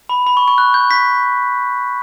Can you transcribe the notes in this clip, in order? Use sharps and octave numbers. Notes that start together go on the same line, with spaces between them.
B5
B5
C#6
C#6
F#6
G6
G6 B6